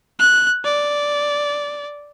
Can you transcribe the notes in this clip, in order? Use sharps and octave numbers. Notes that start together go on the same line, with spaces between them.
F#6
D5